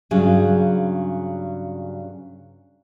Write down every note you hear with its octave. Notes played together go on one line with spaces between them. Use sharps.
G2 C#3 F#3 G#4